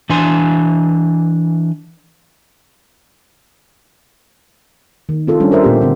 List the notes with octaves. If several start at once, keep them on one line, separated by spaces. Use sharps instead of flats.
E3 D4 G#5 C6
D#3
C4 F4 A4
G3 C#4 D4
A#4 C5 E5
A#2 B3 G4
D3 C4